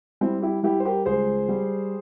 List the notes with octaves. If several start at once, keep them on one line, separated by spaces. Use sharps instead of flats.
G3 C4 E4
E4 G4
G3 E4 G4
C5
G4 A#4
C#2 G#4 C5
G3